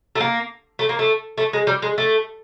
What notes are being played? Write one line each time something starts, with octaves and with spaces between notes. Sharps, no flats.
A3
A#3
A3
A#3
A3
A3
G#3
G3
G#3
A3